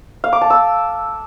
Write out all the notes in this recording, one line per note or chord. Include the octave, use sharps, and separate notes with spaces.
F5
D6
A5
E6